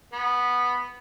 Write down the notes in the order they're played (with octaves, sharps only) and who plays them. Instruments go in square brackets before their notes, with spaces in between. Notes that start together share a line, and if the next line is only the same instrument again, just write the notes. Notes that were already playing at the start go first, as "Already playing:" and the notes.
[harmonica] B3